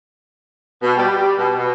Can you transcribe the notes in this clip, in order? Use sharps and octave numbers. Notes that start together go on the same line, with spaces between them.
B2
G3
G3
B2
B2